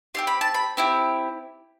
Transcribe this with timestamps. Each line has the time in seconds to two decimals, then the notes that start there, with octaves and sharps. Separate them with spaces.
0.15 C4 E4 G4 C6
0.27 B5
0.41 A5
0.54 B5
0.77 C4 E4 G4